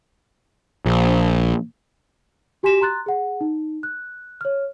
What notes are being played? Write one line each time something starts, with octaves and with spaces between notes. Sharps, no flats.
A#1
F#4 G4 G#5 C6 B6 E7
A#5 C6 F#6 A6
G#4 F#5
D#4
F#6
C#5 F6